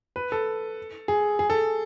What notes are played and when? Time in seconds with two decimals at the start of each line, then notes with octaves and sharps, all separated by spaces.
0.16 B4
0.32 A4
1.08 G#4
1.39 G#4
1.50 A4